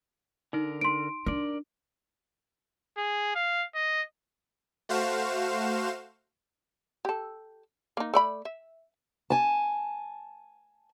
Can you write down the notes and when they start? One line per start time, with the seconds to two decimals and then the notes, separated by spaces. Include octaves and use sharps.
0.53 D3 D#4 A#4
0.81 C6 D7
1.26 D4 A#4 D5
2.98 G#4
3.35 F5
3.75 D#5
4.89 A3 F#4 C5 F5 E7
7.05 G4 A4
7.97 A#3 D#4
8.14 A3 D5 B5
8.45 E5
9.30 G#5 A5